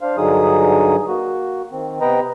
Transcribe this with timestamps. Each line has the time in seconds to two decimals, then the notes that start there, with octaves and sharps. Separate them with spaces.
0.01 D4 C5 F5
0.17 G2 D3 F#3 D#4 G#4 D#6
1.07 A#3 F#4
1.72 D#3 C4
2.01 C3 B3 B4 D#5 G5 A#5